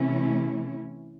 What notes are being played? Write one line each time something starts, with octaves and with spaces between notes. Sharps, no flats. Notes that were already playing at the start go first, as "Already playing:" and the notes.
Already playing: C3 E3 A3 C#4 E4